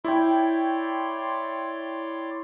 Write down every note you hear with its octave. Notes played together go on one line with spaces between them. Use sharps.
E4 C#5 D5 G5 C6